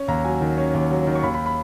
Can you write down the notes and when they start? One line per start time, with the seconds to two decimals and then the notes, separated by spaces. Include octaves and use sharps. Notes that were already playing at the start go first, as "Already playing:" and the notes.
Already playing: C#4
0.08 D#2 A#5
0.24 F#3 G#5
0.41 D#3
0.58 C#4
0.74 D#2
0.91 F#3
1.07 D#3
1.15 C#6
1.23 D#2 B5
1.34 B5
1.46 B5